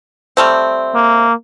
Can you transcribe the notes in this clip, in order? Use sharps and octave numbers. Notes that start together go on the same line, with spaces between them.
G3 A3 C4
A#3